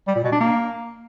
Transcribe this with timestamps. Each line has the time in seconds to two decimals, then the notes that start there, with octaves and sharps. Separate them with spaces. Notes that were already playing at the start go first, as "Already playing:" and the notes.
0.07 G3
0.16 A#2
0.24 B2
0.32 D4
0.41 A#3